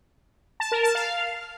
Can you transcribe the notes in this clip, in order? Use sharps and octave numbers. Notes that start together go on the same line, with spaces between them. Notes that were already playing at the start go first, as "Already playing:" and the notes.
A5
A#4
A5
F5